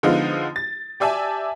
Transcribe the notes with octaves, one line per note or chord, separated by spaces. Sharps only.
D3 F3 G#3 B3 D#4 F4
A6
G4 D5 E5 G#5 A5